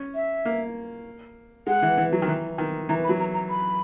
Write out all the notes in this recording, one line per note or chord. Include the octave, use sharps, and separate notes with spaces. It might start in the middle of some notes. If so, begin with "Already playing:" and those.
Already playing: C#4
E5
A#3
G#3 F#5
E3
E3
F#3
D#3
E3
D#3
E3 A#5
B5
F#3
A#5
A#5
B5